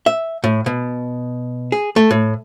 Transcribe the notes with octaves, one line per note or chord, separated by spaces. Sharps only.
E5
A2
B2
G#4
A3
A2